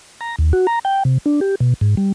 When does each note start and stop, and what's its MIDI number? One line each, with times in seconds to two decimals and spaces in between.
0.21 0.36 82
0.39 0.53 39
0.53 0.67 66
0.67 0.79 82
0.85 1.03 79
1.05 1.18 48
1.26 1.40 62
1.41 1.55 67
1.60 1.74 47
1.81 1.95 44
1.97 2.12 55